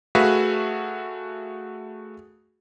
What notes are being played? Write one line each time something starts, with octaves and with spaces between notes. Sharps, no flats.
A3 F#4 G#4 B4 E5 F5